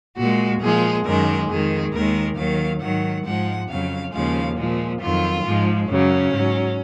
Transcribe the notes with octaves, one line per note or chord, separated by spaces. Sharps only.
A#2 G#3 F#4
A#2 F3 G#3 G#4
F#2 D#3 G#3 A#4
F2 D#3 G#3 G#4
D#2 D#3 G#3 A#4
D#2 D#3 F#3 F5
G#2 D#3 F#3 F#5
G#2 F3 G#3 F#5
F2 C#3 F#3 F5
D#2 C#3 F3 G#3 F5
A#2 F3 G#3
F2 D#3 F#3 F4
G#2 F3 G#3
F#2 C#3 F#3 C#4
G#2 F#3